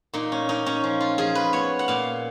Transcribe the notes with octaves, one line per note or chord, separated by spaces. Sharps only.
A#2 D#4
C#4
A#2 D#4
C#4
F3
F4
F3 G#4
B4
B3 C#5
F#5
A#2 F5